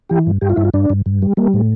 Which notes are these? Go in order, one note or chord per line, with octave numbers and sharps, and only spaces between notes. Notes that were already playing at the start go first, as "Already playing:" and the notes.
E3 G4
G2
G2 G4
F4
G2 E4
F4
G2 D4
G2
G2
G3
G3 A#3
A2